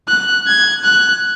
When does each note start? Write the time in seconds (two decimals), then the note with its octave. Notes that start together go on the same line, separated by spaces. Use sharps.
0.08 F#6
0.47 G#6
0.84 F#6